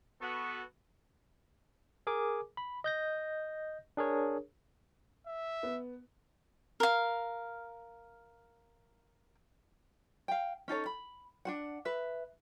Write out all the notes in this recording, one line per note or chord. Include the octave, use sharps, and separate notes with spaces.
B3 F#4 A4 C#6
G#4 A#4 G#5 D6
B5
D#5 G6 A#6
D4 G#4 A#4 C#5
E5
B3
A#4 F5
F5 G5
C#4 D#4 A4 C#5
B5
D4 F#4 F#5
B4 E5